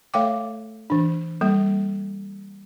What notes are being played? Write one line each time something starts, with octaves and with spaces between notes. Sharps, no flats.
A3 A4 C#5 F5 G5 D6
E3 D4
G3 A#3 A4